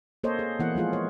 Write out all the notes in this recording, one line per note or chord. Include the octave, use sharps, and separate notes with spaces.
A#3 A4 C5 C#5 D#5
G#4
E3 A#3 B3 E4 F#5
F3 G#3 F4 G#4
C#5